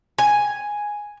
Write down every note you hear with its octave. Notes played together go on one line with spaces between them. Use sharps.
G#5